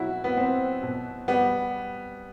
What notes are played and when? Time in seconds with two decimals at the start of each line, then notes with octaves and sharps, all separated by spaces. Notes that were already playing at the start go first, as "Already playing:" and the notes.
Already playing: B2 F#3 E4 F#4
0.24 B3
0.37 F#3 C4
0.83 B2
1.28 G3 B3